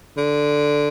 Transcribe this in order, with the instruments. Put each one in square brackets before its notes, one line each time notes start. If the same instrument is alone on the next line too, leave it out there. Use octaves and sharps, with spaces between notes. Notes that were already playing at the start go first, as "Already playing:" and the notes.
[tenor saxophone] D3